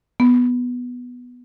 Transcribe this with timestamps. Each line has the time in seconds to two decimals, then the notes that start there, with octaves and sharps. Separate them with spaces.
0.20 B3